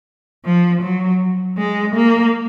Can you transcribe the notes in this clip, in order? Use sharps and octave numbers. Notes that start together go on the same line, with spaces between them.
F3
F#3
G#3
A#3